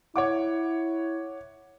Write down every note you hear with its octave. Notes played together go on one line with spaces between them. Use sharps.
E4 C#5 F#5 D6